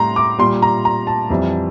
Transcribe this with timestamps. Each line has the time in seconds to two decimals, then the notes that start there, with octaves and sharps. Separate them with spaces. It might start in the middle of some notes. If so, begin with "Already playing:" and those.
Already playing: A2 G3 A#5 C6
0.16 D6
0.38 A#2 G3 C6
0.62 A#5
0.85 A#5
1.07 A5
1.30 F2 E3 G3